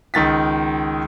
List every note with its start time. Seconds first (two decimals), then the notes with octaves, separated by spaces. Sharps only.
0.14 C#2 D#3 A6 B6